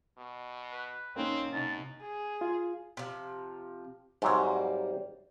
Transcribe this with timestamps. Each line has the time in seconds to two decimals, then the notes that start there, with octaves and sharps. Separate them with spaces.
0.18 B2
0.73 B4
1.16 A#3 C4 C#4 D#4
1.53 F#2 C3 D#4 A5
2.01 G#4
2.41 F4
2.97 C3 F3
4.22 G#2 C3 F#3 G3 A#3